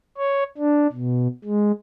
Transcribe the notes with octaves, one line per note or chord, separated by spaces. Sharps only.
C#5
D4
B2
G#3